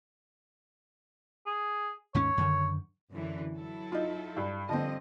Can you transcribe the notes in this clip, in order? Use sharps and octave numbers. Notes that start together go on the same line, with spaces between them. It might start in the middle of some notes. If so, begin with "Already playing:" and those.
G#4
D#2 G#2 C#4 C#5
F#2 D3 D#3
F#2 D3 E3
F#3 E4 A4
D#4 F4
G2
G2 D3 F3 C4 D#5